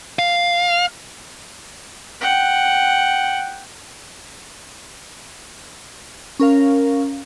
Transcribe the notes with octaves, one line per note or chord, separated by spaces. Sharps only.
F5
F#5 G5
C#4 A#4 F5